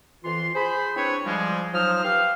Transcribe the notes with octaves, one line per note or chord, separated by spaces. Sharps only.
F2 E3 F4 C6
G#4 C5 B5
C4 D4 E4 B4 C#5
F3 G3 G#3
F3 F#3 D#4 C5 D#6 F6
G4 B4 C5 F5